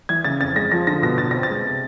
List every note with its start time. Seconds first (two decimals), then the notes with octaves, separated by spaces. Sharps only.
0.09 E3 G#6
0.24 C#3 A6
0.40 F2 A6
0.56 G#3 A#6
0.71 F3 A#6
0.87 D3 A#6
1.02 B2 A#6
1.18 B2 A6
1.31 C4 A#6
1.43 A6
1.50 G#3
1.65 C3